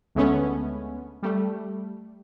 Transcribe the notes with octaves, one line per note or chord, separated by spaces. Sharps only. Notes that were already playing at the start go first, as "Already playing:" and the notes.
D2 G#3 A3 B3 C#4
G3 A3